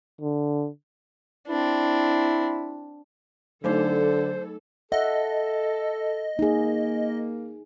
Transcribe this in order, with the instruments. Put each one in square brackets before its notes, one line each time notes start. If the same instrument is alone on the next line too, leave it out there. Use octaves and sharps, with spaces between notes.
[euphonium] D3
[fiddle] C4 D4 [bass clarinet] E4
[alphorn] D3 [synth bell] F#3 A3 D#4 [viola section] A4 [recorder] C5
[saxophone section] A4 [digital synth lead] D#5 [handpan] E5 F#5
[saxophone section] A#3 [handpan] D#4 G#4